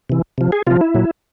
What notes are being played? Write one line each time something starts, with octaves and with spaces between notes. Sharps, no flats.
C3 E3
C3 F3
G#4
C3 F3 F4
E4
A#2 F#3